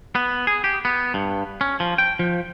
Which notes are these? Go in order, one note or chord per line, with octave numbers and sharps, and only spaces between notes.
B3
G#4
G4
B3
G2
C#4
F3
G5
F3